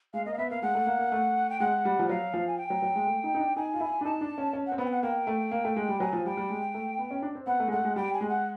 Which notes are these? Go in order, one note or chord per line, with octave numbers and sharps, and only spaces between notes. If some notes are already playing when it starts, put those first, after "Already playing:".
G#3 F5
A#3 D#5
F5
B3 E5
A#3 F5
G#3 F#5
A3
A#3
A#3
A3
G5
G#3 F#5
G3
F3
F#3 F5
F3
G#5
G5
F#3
F#3
G#3
A3
D#4
D#4
D4
D#4 G#5
F4
E4
D4
D#4 A5
D4
C#4
C#4
F#5
C4
B3 F#5
G5
F#5
A#3 G5
A3
A#3
A3
G#3
G3
F#3 G#5
F3
G3 G5
G3
G#3
A3
B3
C#4
D4
C4
B3 F#5
A3
G#3
A3 F#5
G#3
G3 G5
G#5
G#3
F#5